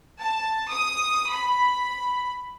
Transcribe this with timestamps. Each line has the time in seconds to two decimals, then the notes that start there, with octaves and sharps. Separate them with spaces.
0.21 A5
0.70 D#6
1.31 B5